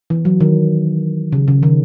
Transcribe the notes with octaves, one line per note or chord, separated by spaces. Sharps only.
E3
F#3
D#3
C#3
C#3
D#3